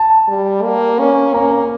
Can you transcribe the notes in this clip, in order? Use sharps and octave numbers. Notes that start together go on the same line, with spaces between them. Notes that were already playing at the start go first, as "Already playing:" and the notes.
Already playing: A5
G3
A#3
C#4
A#3 A#5
A#5